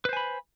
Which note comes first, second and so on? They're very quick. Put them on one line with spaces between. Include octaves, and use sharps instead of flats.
B4 C5 G#5 B5